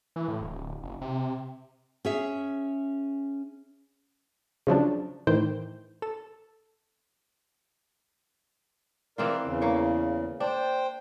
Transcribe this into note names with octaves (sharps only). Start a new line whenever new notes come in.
E3
A2
D1
F#1
C3
C#4 G#4 E5
C#3 F3 F#3 D4
A2 D#3 E3 C5 G5
A4 E6
E3 C4 F4 A#4 D5
E2 C#3
A#3 C#5
D4 C5 G5